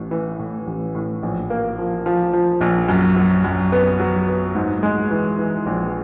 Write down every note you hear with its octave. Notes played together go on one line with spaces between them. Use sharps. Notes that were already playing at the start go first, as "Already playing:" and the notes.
Already playing: A1 A2
E3
A2
A1
A2
A#1
A#3
F3
F3
F3
A#1
F#2
F#3
F#2
B3
F#3
B3
G#2
G#3
E3
E3
A#1